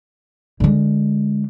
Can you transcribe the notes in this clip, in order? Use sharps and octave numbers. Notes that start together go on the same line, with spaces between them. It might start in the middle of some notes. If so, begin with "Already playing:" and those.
D3 G#3